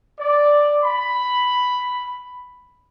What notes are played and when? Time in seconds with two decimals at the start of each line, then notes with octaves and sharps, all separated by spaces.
0.19 D5
0.83 B5